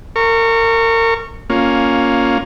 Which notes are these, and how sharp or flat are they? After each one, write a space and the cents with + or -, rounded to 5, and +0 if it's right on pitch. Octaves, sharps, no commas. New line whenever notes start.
A#4 -30 C#6 +0
A#3 +0 C#4 +0 F4 +15